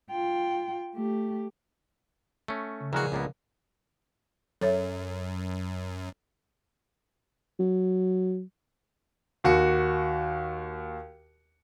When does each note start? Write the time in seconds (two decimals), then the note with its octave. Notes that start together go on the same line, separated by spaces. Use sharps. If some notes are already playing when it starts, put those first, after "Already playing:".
0.11 F4 G5
0.95 A3 G4
2.48 A3 C#4
2.81 C#3
2.93 A#1 E3 G#3 F#4 G#4 A#5 F6 F#6
3.12 C#2 A#3 B3
4.61 F#2 A4 C#5 E5
7.60 F#3
9.44 D#2 F#4 C#7